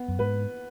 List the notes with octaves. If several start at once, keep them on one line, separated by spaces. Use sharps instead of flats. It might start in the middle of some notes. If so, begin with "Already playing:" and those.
Already playing: B3
F#2
G#2 B4